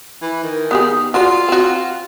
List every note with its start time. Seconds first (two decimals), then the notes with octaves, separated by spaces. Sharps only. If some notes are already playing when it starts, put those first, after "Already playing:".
0.22 E3
0.43 D#3
0.71 B3 G4 G#4
1.14 F4 F#4 C5 D5
1.49 C4 F#4